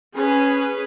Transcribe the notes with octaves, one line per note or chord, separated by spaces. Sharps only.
C#4 G#4 B4